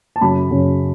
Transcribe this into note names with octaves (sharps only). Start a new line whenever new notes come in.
A5
F#2 C#3 F#3 C#4 B5
F#2 C#3 F#3 C#4